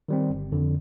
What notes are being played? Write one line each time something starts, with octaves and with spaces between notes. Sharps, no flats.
D#3 G3 C4
G1
F2 D3